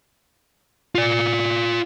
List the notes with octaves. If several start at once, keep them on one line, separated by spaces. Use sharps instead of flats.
F4 D5